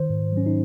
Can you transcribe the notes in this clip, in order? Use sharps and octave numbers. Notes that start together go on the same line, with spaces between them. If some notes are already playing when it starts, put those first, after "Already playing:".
Already playing: D#3 C5
G#2
F#3 C#4
D#4